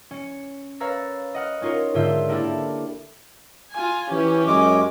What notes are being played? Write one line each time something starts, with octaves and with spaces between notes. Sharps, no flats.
C#4 C#7
B4 C#5 F5 A#5 E6 A6
D#5 F#5 F6
C#4 D#4 F4 A#4 C#5
G#2 D3 F4 E5 G6
A#3 D4 E4 G4 A4
F4 G#5
E3 C#4 G4
F#2 G#3 D6